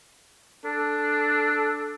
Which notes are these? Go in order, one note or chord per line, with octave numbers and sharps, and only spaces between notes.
D4 A4